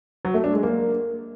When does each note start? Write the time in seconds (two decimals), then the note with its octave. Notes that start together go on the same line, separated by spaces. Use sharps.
0.25 F#3
0.34 A3
0.44 D4
0.53 G#3
0.63 A#3